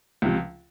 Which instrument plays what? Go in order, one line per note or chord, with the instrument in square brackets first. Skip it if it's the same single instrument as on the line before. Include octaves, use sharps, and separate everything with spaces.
[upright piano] C#2 C3 F3